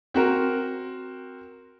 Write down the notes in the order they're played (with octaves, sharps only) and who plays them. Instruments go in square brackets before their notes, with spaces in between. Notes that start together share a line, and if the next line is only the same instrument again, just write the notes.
[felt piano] C4 F#4 A#4